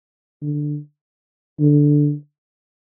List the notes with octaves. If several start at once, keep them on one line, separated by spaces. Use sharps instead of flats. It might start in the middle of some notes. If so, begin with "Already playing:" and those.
D3
D3